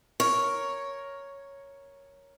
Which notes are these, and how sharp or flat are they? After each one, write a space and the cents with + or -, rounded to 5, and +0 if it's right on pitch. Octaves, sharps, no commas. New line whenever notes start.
A#4 +0 C#5 +0